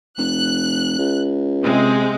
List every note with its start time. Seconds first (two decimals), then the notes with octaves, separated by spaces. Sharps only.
0.18 F1 F#6
0.98 C#2
1.63 C3 G#3 C4